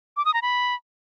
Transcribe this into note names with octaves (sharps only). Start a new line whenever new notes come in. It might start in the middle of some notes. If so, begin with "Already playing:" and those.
D6
D#6
A#5
B5